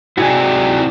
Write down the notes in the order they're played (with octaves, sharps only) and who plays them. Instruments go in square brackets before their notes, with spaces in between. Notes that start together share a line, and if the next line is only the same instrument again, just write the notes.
[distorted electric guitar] G#2 C3 [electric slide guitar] E4 D5 [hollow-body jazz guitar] F#4 G#4